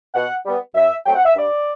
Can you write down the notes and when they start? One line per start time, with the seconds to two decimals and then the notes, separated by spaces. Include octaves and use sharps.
0.15 B2 F#5
0.45 G3 B3
0.75 F#2 E5
1.05 F#3 A3 C4 G5
1.15 F#5
1.25 E5
1.35 G2 D5